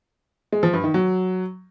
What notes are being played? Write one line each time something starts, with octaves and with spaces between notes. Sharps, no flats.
G#3
F3
G2
D#3
F#3